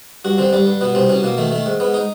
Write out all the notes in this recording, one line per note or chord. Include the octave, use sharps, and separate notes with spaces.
G2 F#4
D3 C4
G2 G3
G2
B2 B3
C2 C4
B2 C#4
B2 A#3
D#3 A3
D#3 A3
G#2
G#2 B3
D#4